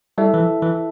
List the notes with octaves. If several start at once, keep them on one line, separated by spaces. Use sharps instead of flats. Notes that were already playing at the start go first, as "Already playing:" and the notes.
G3 E4 A4 E5 A5
E3
F3
E3